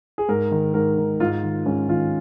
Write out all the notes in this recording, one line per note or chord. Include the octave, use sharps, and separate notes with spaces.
G#4
G#2 A#4
D#3
G#2 A#4
D#3
G#2 F4
D#3
G#2 C#4
D#3 F4